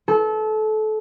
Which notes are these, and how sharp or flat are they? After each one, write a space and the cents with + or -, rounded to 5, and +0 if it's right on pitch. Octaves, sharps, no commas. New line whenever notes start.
A4 -25